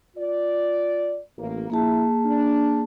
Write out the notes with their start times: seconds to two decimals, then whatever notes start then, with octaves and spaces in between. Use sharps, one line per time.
0.17 F4 D5
1.38 A1 A#3
1.70 A#1 A#3 E4 G#4 A5
2.25 D4